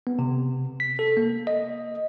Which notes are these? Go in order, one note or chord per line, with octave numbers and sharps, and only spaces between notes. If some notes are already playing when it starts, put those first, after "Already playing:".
B3
C3
B6
A4
A#3
D#5